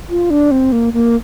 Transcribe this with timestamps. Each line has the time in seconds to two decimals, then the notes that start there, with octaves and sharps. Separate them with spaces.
0.10 F4
0.30 D4
0.51 C4
0.72 A#3
0.93 A#3